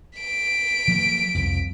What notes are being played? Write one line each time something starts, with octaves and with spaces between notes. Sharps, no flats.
B6 D7
F3 F#3 A#3
C2 F2